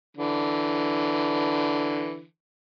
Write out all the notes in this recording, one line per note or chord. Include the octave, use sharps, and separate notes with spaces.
D3 E3